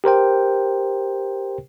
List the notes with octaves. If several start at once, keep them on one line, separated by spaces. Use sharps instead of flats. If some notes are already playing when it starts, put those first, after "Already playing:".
G4 A#4 C5 G5